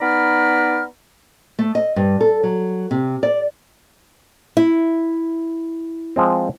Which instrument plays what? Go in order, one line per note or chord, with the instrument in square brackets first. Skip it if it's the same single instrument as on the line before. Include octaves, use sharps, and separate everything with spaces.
[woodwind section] B3 D#4 D5 A#5 B5 F6
[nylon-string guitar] A3
D#5
G2
A4
F#3
C3
D5
E4
[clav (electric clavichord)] F3 G#3 C4